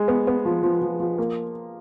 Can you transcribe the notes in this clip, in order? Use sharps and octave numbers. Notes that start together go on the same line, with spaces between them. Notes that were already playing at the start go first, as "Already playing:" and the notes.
Already playing: G#3
B3
B3
F3
F3
F3
F3
A#3